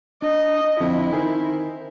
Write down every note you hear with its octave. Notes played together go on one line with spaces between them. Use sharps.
D4 D#5
F2 D3 E4
D#3 A#4 C5 G#5